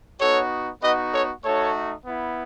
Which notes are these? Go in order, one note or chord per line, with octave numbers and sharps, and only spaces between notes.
B3 D#4 F#4 A4 C#5
B3 D#4 F#4 B4 D#5
A4 C#5
A3 D#4 F#4 A4 C#5
B3 E4